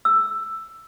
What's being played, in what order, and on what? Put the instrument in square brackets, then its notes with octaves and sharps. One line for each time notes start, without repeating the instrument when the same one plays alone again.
[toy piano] E6